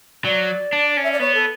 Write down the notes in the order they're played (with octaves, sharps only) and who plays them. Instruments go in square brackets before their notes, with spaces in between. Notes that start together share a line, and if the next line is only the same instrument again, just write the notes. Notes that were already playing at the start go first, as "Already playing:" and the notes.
[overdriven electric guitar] F#3 [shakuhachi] D5
[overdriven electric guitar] D4
C#4
[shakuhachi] E5
D5
[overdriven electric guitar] B3 [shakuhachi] C#5
[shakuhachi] A4